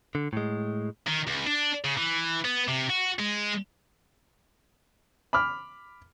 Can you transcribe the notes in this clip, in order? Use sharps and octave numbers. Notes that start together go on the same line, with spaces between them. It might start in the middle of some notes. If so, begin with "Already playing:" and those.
D3
A2 G#3
D#3
C#2
D4
C#3
E3
B3
C3
F#4
G#3
B5 D6 F6